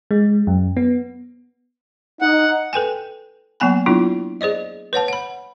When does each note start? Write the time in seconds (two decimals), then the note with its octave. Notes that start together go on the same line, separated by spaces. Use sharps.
0.11 G#3
0.47 F#2
0.77 B3
2.21 D#4 F#5
2.73 A4 B4 G5 G#5
3.60 F#3 A#3 B3 G#5 B5
3.86 F#3 B3 D4 E4 F4
4.41 G#4 C5 D5 D#5
4.93 B4 C#5 F#5 A5
5.08 F#5 B5